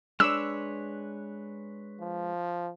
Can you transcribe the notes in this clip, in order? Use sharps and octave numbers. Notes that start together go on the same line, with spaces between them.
G#3 D4 B4 C#5 E6
F3